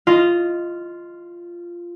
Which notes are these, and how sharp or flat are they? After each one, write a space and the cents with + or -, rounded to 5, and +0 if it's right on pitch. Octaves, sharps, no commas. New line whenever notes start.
F4 -10 D#5 +0